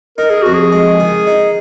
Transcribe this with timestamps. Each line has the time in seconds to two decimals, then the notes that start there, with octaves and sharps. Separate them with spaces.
0.18 D#4 A#4
0.30 G#4
0.43 F2 F#4
0.54 G#4
0.72 G#3
1.00 D#3
1.27 D#4